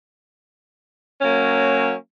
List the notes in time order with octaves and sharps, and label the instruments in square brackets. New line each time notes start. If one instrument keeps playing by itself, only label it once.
[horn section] F#3 A#3 C#4